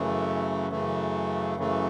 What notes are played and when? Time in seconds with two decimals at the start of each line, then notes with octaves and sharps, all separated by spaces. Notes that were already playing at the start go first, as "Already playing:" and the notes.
Already playing: F#2 C#3 E3 A3
0.71 F#2 C#3 E3 A3
1.58 F#2 C#3 E3 A3